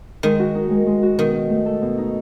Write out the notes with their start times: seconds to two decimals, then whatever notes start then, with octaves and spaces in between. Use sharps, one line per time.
0.23 D#3 G#3
0.39 F#4
0.55 D#4
0.70 G#3
0.86 G#3
1.03 F#4
1.18 B2 D#3
1.34 D#4
1.50 A3
1.66 A4
1.82 B2
1.98 D#4